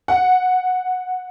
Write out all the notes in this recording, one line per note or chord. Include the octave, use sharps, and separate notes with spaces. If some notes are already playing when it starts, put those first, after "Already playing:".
F#5